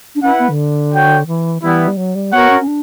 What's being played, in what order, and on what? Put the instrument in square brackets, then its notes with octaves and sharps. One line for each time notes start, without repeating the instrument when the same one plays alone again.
[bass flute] D4
[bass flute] C#4 [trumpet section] E4 B4 F#5
[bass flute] B3
D3
[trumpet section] F#4 C#5 G5
[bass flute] E3
[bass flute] E3 [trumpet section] G3 B3 E4
[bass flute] G3
F#3
G3
[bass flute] B3 [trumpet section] F#4 A#4 C#5 F#5
[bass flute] C#4
C#4
D4